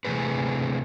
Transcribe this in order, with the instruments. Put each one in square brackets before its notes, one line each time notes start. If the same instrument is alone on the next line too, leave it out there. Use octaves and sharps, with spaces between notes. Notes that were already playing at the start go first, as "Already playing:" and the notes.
[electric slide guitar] C3 E3 A3 G#4 B4